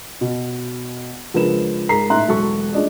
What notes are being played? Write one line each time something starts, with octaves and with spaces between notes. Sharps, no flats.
B2
C#2 F3 D4 A#4 B4 E7
G#2 G#4 A#4 A#5 B6 C7
A2 D#4 E5 A#5 C6 F#6
E1 F#3 A4 C#6
A3 D4 F4 G#4 D5 D#5